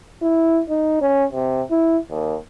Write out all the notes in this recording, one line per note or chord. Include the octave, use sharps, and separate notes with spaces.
E4
D#4
C#4
C3
E4
D#2